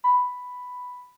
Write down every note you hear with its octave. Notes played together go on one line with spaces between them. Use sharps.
B5